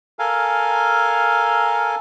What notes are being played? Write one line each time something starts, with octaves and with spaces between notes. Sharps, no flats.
A4 A#4 F5 G#5